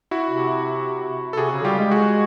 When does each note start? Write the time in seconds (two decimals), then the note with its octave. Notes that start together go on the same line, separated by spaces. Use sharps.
0.11 E4 F#4
0.29 C3
1.33 A4
1.37 C3 F#4 G#4
1.51 C#3
1.64 G3 F4 G4
1.78 G#3
1.91 F#4 G#4